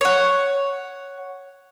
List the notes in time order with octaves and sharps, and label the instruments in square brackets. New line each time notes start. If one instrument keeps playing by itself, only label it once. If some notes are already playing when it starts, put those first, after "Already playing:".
[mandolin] C#5 F#5